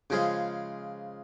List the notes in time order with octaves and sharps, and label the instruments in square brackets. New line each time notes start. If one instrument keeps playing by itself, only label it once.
[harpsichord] C#3 F3 G#3